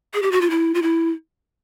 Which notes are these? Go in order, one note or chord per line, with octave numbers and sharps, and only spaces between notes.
G#4
G4
F#4
F4
E4
F4
E4